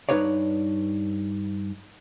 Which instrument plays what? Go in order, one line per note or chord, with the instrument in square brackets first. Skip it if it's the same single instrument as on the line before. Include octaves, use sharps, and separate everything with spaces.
[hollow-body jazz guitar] G2 B3 D#4 B4 C#5 D5